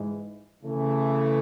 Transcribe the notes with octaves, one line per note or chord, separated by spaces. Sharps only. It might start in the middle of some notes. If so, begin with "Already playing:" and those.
Already playing: G#2 E3 G#3
C#3 E3 A3